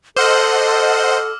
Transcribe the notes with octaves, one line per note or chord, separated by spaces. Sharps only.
A4 C5 D#5 F#5 C6 D6 E6 F6